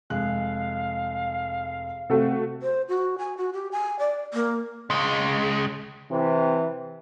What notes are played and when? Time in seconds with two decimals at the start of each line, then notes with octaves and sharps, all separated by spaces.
0.10 F1 G#3 F5 F#6
2.10 C3 A3 C4 F#4 A4
2.63 C5
2.89 F#4
3.19 G#5
3.37 F#4
3.53 G4
3.72 G#5
3.99 D5
4.34 A#3
4.90 C#2 G#3
6.11 C3 E3